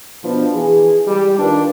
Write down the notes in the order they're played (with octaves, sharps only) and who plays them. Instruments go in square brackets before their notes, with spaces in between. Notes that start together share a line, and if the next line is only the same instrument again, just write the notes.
[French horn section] B2 F3 B3 D4
E3 G#4
G3
D#3 D4 F4 A#4 B4